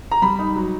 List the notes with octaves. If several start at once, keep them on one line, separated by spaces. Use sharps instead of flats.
A#5
G3 B5
D#4
F#3